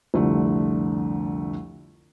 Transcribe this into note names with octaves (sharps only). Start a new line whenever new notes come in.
C2 F2 D3 A3